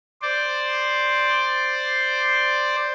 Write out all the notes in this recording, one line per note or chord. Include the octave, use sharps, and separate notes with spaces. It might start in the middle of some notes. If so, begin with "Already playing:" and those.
C5 D5